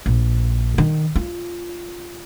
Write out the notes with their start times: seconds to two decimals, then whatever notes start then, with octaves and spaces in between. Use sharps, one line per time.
0.06 A#1
0.78 D#3
1.16 F4